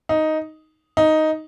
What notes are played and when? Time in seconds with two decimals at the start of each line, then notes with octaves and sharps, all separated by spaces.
0.09 D#4
0.97 D#4